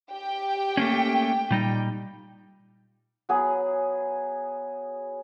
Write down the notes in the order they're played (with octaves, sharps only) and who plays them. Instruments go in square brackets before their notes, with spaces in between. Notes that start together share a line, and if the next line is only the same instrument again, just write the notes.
[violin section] G4 G5
[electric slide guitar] A3 A#3 C#4
A#2 G3 D#4
[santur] F#3 B3 G#4